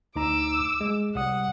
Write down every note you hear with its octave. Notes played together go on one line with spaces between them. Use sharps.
D2 D#4 A#5 D6 E6
G#3
C2 G3 F#5 D#6